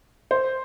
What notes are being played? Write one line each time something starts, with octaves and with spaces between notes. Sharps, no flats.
C5